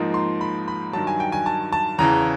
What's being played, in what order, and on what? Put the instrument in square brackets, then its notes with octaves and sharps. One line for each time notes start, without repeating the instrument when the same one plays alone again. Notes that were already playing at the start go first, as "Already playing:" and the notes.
Already playing: [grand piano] G#2 F3 A#3 D#4
C6
B5
B5
G2 D#3 F#3 A5
G#5
G5
G#5
A5
A5
E2 C#3 E3 A#5